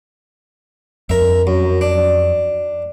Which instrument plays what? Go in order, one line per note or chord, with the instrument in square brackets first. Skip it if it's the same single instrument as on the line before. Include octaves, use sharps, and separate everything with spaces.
[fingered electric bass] F2 [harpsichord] A#4 E5
[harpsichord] F#2
D4